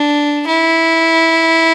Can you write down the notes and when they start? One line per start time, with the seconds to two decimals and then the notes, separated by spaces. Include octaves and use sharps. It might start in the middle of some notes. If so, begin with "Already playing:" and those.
Already playing: D4
0.47 E4